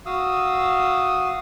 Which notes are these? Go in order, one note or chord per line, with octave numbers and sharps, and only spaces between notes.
F#4 F5 D#6 E6